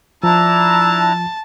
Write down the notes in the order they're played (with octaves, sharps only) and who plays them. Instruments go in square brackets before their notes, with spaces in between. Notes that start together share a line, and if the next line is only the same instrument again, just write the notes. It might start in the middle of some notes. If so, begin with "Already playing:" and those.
[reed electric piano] F3 [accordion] D4 E4 A#5 [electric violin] A5 [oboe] E6